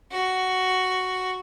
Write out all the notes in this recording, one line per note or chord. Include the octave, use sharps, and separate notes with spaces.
F#4